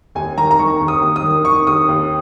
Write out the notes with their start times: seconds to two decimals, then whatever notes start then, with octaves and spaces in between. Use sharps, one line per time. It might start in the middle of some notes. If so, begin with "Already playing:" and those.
0.15 D#2 G#5
0.38 D#3 A#5
0.51 A#5
0.59 D#3 C#6
0.81 D#2
0.88 D#6
1.02 D#2
1.16 D#6
1.24 D#3
1.45 D#3 C#6
1.67 D#2 D#6
1.88 D#2